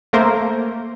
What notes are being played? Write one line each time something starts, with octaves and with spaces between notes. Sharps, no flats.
A3 A#3 A#4 C5